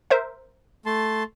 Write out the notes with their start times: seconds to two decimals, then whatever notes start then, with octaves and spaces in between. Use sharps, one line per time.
0.10 A#4 C5 E5
0.86 A3 A5 C6